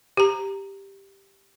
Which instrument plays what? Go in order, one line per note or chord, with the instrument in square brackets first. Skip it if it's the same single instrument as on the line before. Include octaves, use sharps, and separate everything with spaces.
[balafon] G4 A#5